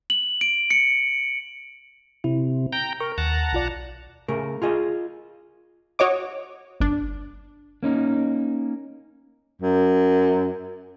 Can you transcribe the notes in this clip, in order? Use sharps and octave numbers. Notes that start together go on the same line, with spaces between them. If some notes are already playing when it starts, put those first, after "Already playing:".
F#7
D7
C#7
C3 E4
G5 A#5 G6
A#4 C#6
D#2 F#5 A5 A#5
B1 F4 D5
C#3 A3 A#4
F4 G#4 D#5
F#4 C#5 D#5 D6
G1 D4
A#3 C#4 D#4
F#2